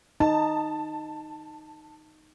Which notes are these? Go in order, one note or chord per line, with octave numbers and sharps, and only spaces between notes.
D#4 A5